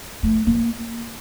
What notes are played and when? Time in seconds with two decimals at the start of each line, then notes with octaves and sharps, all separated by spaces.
0.23 A3
0.47 A#3